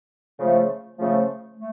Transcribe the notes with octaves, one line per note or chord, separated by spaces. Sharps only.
C#3 F3 A3
C#3 F3 A3
A3